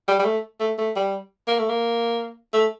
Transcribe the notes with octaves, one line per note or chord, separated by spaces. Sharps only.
G3
G3
A3
A3
A3
G3
A#3
A3
A#3
A3